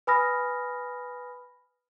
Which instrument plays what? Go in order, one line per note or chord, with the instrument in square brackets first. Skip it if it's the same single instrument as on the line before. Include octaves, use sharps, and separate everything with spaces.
[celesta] B4 G#5 B5 D#6 F6 A#6